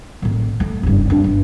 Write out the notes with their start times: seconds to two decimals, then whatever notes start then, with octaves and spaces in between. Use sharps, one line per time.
0.22 A1 A#2
0.60 A3
0.83 F#1 G2
1.10 E3 D4
1.24 G1